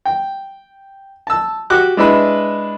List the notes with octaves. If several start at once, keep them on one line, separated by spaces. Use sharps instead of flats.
G5
A5 E6
F#4 G4 D6 F#6
G#3 D4 E4 B4 B5